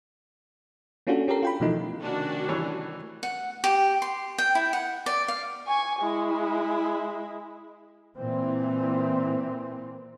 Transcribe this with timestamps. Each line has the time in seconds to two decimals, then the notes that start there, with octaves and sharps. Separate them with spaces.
1.07 A#3 C#4 D4 F4 F#4 A4
1.28 C#4 G4 A4 A#4 C7
1.43 F4 G5 B5
1.60 B2 E3 F3 A3 D#4
2.01 C3 D#3 A3 C#4 D4 F#4
2.49 E3 G3 C#5
3.23 F#5
3.64 G4
4.02 C6
4.38 G5
4.55 E4
4.73 F#5
5.06 D5
5.28 F5
5.67 G#5 C#6
6.00 G#3 E4
8.16 A#2 E3 C4